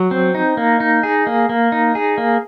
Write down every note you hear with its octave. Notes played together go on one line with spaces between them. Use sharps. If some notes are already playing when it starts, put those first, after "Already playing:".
Already playing: F#3
C4
D#4
A#3
D#4
G#4
A#3
A#3
D#4
G#4
A#3